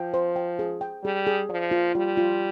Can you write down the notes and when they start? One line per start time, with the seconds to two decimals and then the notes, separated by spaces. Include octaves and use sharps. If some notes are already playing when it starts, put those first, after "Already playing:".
Already playing: F3 G5
0.14 C5
0.36 G5
0.59 G#4
0.81 G5
1.04 G3 G#4
1.27 G#4
1.49 F3 D5
1.71 F4
1.95 G3 F4
2.17 F4